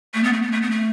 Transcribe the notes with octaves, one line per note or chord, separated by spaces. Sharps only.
A3
B3
A3
B3
A3
B3
A3